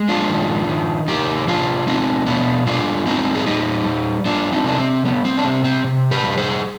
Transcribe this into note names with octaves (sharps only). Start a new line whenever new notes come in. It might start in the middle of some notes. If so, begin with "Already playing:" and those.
Already playing: G#3
D4 F4
D#3
D#3
C3 D#4 G4
C3 D4 F4
G3 C4 D#4
B2 B3 D4
G3 D4 F4
G3 C4 D#4
G#4
G3 D#4 G4
G3
G3 D4 F4
C4 D#4
C3 D4
C4
G3 B3
C4
D4
C3 C4
C4
C3
G4 B4
G3
G#4 C5